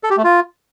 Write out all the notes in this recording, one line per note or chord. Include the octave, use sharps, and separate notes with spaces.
A4
G4
A3
F4